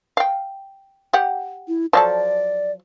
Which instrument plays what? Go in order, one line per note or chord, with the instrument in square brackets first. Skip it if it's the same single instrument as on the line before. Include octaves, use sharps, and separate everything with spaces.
[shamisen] F5 G5
G4 F#5
[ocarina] E4
[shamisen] F3 F#3 A4 [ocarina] D5